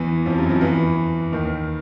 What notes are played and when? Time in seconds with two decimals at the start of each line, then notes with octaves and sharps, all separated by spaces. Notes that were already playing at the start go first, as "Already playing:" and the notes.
Already playing: E2 E3
0.26 F2 F3
0.38 F#2 F#3
0.50 F2 F3
0.61 E2 E3
1.32 D#2 D#3